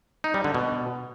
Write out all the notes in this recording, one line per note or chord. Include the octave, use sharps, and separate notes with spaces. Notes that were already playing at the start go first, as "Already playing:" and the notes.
D#4
G3
D3
B2